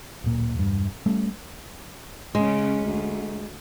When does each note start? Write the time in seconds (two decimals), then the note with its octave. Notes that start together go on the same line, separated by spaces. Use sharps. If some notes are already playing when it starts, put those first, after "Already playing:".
0.24 D1 A#2
0.55 E1 G2
1.06 G3 A3 C#4
2.35 C#3 G#3 C#4
2.83 D2